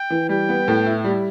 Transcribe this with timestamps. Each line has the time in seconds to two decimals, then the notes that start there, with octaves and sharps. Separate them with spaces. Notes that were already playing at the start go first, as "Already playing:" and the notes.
Already playing: G5
0.10 E3
0.29 G3 G5
0.49 B3
0.68 A2
0.86 E4
1.04 G3